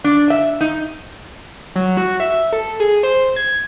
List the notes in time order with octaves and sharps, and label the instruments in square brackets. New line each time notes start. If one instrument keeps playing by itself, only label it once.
[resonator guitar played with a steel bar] D4
E5
D#4
[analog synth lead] F#3
F#4
E5
A4
G#4
C5
G#6